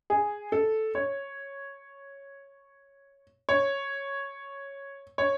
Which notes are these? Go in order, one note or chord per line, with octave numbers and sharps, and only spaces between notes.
G#4
A4
C#5
C#5
C#5